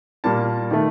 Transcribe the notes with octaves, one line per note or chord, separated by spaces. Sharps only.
A#2 G3 A#3 A5
D#3 A3